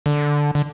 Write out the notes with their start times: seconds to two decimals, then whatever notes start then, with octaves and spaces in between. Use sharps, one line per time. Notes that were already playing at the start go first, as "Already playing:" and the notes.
0.06 D3
0.55 D3